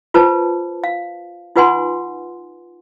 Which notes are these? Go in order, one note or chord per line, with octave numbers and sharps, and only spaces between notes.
F4 B4 C5 A5
F5
D#4 F4 B4 F#5 G#5 C6